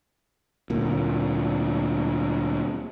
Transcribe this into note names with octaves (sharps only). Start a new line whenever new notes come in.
D2 A#2